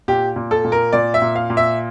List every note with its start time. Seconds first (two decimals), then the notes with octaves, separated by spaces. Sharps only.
0.08 A#2 G4
0.36 A#2
0.51 A4
0.65 A#2
0.72 A#4
0.93 A#2 D5
1.14 E5
1.22 A#2
1.36 F5
1.50 A#2
1.57 E5